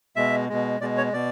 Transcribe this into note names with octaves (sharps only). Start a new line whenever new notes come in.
B2 G#3 E5
B2 G#3
B2 G#3 D5
C#5
B2 D5